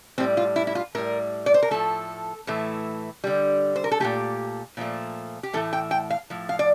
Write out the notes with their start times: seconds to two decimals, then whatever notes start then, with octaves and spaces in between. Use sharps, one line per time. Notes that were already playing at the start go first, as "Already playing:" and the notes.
0.18 A2 G3 C4
0.37 F4
0.56 E4
0.67 E4
0.75 F4
0.95 A2 G3 A#4
1.46 D5
1.54 C5
1.63 A#4
1.71 A2 F3 A3 A4
2.47 A2 E3 A3
3.24 D3 G3
3.76 C5
3.84 A#4
3.91 A4
4.00 A#2 F3 A3 G4
4.77 A#2 F3 A3
5.43 G4
5.53 A2 E3 A3 A4
5.73 G5
5.91 G5
6.10 F5
6.30 A2 F3
6.49 F5
6.59 D5